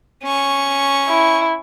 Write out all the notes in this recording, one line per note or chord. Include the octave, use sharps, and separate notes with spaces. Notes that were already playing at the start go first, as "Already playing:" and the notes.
C#4 C#6
E4